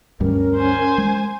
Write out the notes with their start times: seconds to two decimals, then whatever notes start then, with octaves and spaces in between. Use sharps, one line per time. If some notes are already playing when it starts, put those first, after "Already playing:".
0.20 D2 G2 G3 C#4 A#4
0.56 C5 G#5
0.98 G#3